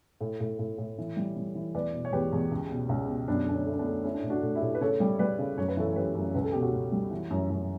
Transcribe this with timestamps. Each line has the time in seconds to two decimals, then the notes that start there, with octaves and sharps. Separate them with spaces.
0.21 A2
0.40 A2
0.59 A2
0.78 A2
0.98 E3
1.17 G3
1.37 G3
1.55 E3
1.74 E2 B4 D5
1.93 B2
2.05 C#5
2.12 E2 G4 B4
2.32 E2
2.51 C#2
2.71 B2
2.89 C#2
3.09 B2
3.28 F#2 B3 D4
3.47 D3 D4
3.53 C#4
3.66 A3
3.73 C#4
3.79 B3 D4
3.85 A3
4.04 A3 C#4 E4
4.14 D4
4.22 A2 E4
4.30 D4 F#4
4.42 A2
4.55 E4 G4
4.62 A2
4.75 B4
4.81 C#3 A4 C#5
5.00 G3
5.19 G3 B4 D5
5.39 C#3
5.57 F#2 C#5
5.68 B4
5.77 E3 A4 C#5
5.91 C#5
5.96 F#2 G4 B4
6.15 F#2
6.34 C#2 B4
6.44 A4
6.52 B2 G4
6.62 F#4 A4
6.72 C#2
6.92 G3
7.11 E3
7.31 F#2
7.50 F#2